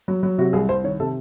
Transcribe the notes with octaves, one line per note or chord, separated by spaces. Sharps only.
F#3
F#3
C3 F#4
C2 G#4
C2 C5
D#3 C#5
C3 A4